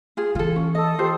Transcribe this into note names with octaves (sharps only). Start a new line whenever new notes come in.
F4 G#4
E3 F4 A4
C#4
A4 D#5 D#6
F4 G4 C5